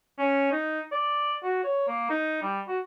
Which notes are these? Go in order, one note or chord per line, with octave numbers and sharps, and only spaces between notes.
C#4
D#4
D5
F#4
C#5
A#3
D#4
G3
F#4